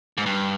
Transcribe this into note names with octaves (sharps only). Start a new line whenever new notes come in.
G#2
G2